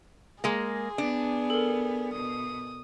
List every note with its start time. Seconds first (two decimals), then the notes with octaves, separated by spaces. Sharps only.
0.44 G#3 A#3 G#4
0.98 B3 D4
1.50 A4 A#4
2.14 B2 D#6